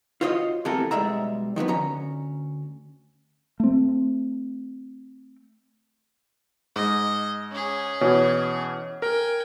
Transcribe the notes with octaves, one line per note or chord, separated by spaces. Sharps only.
F4 F#4 C5 C#5 D#5
C3 E3 A3 B3 A4 A#4
B1 G3 G#3 E5 A#5
D#3 F3 F#3 B3
D2 C#4 A#5
A3 C4
G#2 D#5
C#4 G#4
B2 E3 C#5
A#4 G5 G#5